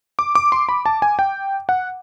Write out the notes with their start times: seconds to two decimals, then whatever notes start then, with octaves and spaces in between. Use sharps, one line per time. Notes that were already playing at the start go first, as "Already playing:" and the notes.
0.19 D6
0.35 D6
0.52 C6
0.69 B5
0.86 A5
1.02 G#5
1.19 G5
1.69 F#5